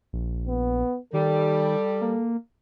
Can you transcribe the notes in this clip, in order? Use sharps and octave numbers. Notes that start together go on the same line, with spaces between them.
A#1
B3
D#3 G3 A4
A#3